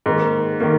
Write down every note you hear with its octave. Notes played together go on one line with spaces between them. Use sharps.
G#2 D#3 A#3
D#3 A#3